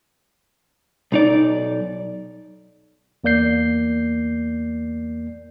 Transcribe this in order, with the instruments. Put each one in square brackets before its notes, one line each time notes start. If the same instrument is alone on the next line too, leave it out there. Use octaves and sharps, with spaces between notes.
[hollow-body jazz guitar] B1 D#4 D5
[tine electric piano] E2 A#3 D5 G6 C7